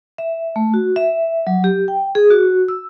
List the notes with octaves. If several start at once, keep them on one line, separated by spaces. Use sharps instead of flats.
E5
A3
F#4
E5
F#3
G4
G5
G#4
F#4
E6